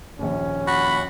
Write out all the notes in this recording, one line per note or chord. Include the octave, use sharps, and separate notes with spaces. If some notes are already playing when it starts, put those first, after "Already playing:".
A#1 D#2 C#4
F#4 B5